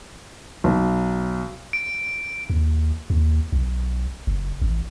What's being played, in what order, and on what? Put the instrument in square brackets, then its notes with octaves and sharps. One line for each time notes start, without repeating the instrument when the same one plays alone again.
[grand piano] B1
[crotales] D7
[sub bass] D#2
D#2
B1
F#1
A1